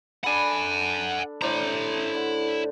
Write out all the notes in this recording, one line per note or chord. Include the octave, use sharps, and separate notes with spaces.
D4 A4 F#5 G#5 B5
A2 D4 E4 C5 A#5
D3